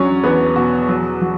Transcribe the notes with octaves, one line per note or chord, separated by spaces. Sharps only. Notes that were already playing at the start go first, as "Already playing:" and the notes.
Already playing: E2 F#3 C#4 D4 C#5
E2 B3 B4
B2 F#4
F#3
F#3